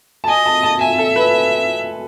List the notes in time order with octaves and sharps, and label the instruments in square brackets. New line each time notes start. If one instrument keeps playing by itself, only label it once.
[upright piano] A5
[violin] D#5 [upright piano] G#5
[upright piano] A5
A5
[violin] E5 [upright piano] G#5
[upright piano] A4
B4